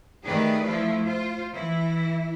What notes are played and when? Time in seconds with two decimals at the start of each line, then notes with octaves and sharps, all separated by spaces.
0.24 D#3 A3 G4 G#4 B4 D5
0.65 F3 A3 E4 F4
1.05 F4 C5
1.53 E3 E4